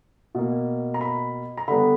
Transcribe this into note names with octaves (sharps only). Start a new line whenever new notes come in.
B2 A#3
A#5
B5
A#5
D3 G3 B3 B5